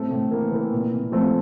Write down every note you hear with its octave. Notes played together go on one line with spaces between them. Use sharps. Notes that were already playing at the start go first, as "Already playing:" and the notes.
Already playing: A2 A3 C4
A2
E3 A#3
E3
A#2
A#2
F3 A3 C4